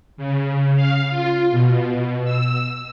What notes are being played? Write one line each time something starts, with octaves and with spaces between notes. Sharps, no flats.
C#3
F5
F4
B2
E6